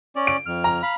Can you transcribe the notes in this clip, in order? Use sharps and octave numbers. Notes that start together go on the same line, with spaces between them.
C#4 D5
D7
F2 F6
A#5
F5 B5